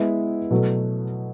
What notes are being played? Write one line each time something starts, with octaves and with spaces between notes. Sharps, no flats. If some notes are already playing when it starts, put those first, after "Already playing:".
Already playing: G#3 B3 E4
B2 F#3 A3